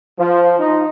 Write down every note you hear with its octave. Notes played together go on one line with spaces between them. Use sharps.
F3
D#4